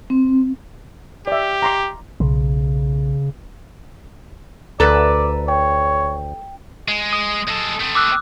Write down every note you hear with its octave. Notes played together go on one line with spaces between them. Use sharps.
C4
G4 D5 E5
A#5 C6 D6
B1 C#3
D2 A4 B4 D5 A#5
C#5 G5
G#3
D#6
G#3 A4
A3 C4
D6 E6 F#6